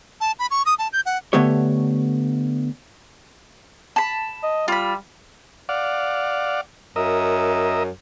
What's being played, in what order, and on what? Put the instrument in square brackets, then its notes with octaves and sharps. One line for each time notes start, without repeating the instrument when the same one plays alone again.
[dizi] A5
B5
C#6
D#6
A5
G6
F#5
[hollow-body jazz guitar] D3 A3 B3 G4 C#5
[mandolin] A5 B5
[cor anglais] D#5
[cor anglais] G3 [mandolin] F4 B5
[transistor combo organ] D5 F5 F#5
[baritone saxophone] F#2 [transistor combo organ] A#4 D#5 E5